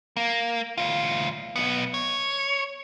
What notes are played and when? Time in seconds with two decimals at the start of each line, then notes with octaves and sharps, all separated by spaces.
0.17 A#3
0.78 D2 F4
1.56 B1 B3
1.94 C#5